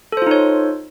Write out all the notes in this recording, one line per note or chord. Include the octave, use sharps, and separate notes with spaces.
D#4 F4 A4 C5 C#5